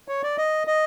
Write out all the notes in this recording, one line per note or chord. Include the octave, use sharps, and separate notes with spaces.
C#5
D5
D#5
D#5